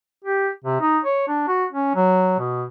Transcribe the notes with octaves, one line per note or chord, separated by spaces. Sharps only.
G4
C3
D#4
C#5
D4
F#4
C#4
F#3
B2